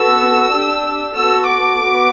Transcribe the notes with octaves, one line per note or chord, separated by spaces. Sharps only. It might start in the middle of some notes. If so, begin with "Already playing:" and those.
Already playing: B3 F#4 A4 E6
D4 G4
B3 F#4 A4 E6
D6
B3 F#4